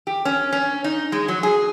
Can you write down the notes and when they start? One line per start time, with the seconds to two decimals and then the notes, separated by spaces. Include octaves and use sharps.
0.07 G4
0.25 C#4
0.52 C#4
0.84 D#4
1.12 G#3
1.28 F#3
1.43 G#4